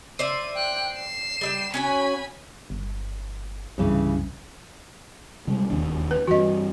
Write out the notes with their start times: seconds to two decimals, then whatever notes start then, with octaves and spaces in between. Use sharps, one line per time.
0.19 C5 D5 E5 D#7
0.55 G5 F#6
0.95 C7 E7
1.41 G3 E5 G5
1.74 C#4 F#4 C#5 G#5 B5
2.70 G1
3.78 C2 G2 C#3 E3
5.47 C3 G3 G#3
5.70 E1 D#2 D4
6.11 B4
6.27 G2 E3 F#4 D#5